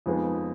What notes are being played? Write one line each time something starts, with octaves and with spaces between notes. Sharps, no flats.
F2 F3 G#3 B3 D#4